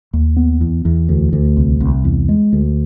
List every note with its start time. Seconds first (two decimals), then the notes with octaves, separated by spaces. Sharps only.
0.13 D#2
0.37 B3
0.61 E2
0.85 E2
1.09 D2
1.33 D2
1.57 C2
1.80 C2
2.04 E2
2.29 G#3
2.53 D2